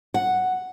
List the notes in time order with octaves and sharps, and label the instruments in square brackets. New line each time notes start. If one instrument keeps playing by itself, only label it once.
[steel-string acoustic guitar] F#5